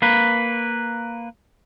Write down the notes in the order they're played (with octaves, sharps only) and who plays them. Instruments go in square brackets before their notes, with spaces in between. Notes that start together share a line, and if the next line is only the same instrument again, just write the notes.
[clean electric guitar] A#3 B4